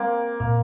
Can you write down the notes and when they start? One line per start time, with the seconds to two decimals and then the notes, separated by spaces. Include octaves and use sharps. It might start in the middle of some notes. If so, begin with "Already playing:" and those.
Already playing: G#3 A#3 C4
0.40 A#2 A#3